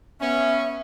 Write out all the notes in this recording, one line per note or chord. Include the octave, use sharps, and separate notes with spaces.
B3 C#4 E5